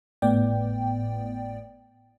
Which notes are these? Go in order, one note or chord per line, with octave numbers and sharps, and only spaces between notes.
G#1 A2 B3 D5 G5